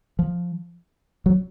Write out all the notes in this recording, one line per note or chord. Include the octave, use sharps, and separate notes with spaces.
F3
F#3